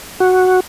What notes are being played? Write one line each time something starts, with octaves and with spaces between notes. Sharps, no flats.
F#4